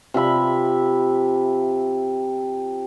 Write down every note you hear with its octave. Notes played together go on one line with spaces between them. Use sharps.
C3 F3 E5 B5